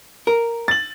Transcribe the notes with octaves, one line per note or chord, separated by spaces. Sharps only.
A#4
A6 F#7